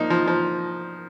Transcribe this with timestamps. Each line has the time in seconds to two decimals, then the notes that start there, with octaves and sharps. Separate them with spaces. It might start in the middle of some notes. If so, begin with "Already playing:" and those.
Already playing: F3 A#3 D#4
0.10 F3
0.28 F3